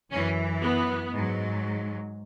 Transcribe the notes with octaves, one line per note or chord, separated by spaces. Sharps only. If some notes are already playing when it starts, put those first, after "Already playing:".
F#2 E3 C#4
B3
G#2 F#3